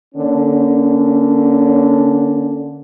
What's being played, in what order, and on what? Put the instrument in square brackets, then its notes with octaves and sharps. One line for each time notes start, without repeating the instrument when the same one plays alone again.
[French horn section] D3 A#3 C#4